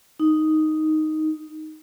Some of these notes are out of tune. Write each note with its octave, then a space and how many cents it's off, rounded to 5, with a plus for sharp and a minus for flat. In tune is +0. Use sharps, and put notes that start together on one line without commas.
D#4 +0